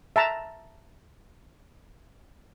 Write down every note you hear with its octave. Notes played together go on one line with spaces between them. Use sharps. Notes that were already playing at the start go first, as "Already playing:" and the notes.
E5 A5 A#5